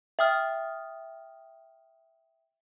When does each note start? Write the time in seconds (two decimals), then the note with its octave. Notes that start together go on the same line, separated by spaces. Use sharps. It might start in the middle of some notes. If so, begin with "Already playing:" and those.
0.19 E5 G5 D#6 F6